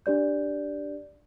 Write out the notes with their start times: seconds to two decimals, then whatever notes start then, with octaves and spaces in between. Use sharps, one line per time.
0.06 D4 G4 D5 G6